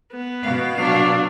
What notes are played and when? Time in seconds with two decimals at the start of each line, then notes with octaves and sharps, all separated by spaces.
0.12 B3
0.43 B2 F5
0.76 F#3 D4